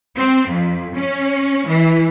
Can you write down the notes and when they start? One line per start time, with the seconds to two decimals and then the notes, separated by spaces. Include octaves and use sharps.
0.17 C4
0.48 F2
0.97 C#4
1.68 E3